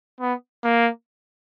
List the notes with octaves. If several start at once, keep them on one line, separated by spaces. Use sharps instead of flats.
B3
A#3